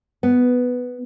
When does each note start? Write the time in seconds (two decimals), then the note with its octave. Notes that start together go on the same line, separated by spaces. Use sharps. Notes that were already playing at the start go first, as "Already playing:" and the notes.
0.23 B3